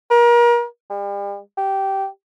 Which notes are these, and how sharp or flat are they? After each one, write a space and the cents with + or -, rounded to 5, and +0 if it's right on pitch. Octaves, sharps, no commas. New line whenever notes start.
A#4 +35
G3 +40
G4 -15